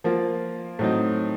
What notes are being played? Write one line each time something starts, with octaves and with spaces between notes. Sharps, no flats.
F3 A#3 F4
A2 F#3 C4 D#4